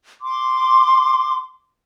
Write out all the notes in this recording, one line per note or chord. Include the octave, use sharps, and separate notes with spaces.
C6 D6